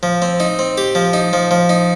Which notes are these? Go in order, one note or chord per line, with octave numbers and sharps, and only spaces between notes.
F3
C4
D#4
C4
G4
F3
D#4
F3
F3
D#4